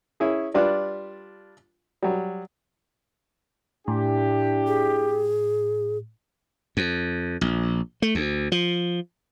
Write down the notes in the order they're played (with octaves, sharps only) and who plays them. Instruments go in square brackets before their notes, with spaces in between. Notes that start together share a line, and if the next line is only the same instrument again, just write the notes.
[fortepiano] C#4 E4 G#4
G3 D4 F4 B4
F#3 G3
[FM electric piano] A2 [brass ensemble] D4 E4 G4
[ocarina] G#4
[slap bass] F2
A#1
A3
D2
F3